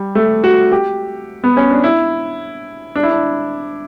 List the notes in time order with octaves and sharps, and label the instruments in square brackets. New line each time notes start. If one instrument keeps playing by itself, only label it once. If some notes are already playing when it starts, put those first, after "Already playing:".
Already playing: [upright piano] G3
A3
F#4
G4
B3
C#4
D4
E4
D4
E4
D4